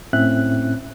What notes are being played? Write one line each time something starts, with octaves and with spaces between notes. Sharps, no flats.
A2 C4 C#4 E5 F#6